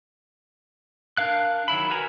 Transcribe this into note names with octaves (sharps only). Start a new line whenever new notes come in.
D4 A#4 F5 F#6
D#3 F#3 E4 B5
F#4 A#4 B4 G#5 A#5